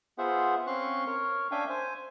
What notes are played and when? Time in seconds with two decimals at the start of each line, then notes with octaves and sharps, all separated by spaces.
0.18 B3 F4 G#4 C5 E5 F#5
0.67 C4 C#4 F5 C6 C#6 F#6
1.07 A#4 C#5
1.51 C#4 D4 E5 F5 G5 G#5
1.69 C5 G#5